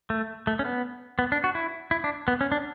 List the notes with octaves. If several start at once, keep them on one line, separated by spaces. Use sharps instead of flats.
A3
A3
C#4
B3
B3
D4
F#4
E4
E4
D4
B3
C#4
D4